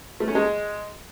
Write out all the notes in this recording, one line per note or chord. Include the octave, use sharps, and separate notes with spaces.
A3
C#4
G#3